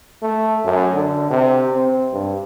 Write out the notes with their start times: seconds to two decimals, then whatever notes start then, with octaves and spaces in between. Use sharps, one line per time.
0.22 A3
0.64 F#2
0.93 D3
1.30 C3
1.72 C4
2.12 G2